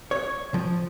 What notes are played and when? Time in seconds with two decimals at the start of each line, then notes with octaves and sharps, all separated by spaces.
0.11 C#5
0.54 F3